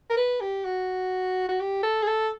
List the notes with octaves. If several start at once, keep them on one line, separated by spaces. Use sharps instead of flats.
A#4
B4
G4
F#4
F#4
G4
A4
G#4
A4